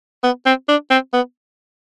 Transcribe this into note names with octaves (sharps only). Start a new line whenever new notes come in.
B3
C4
D4
C4
B3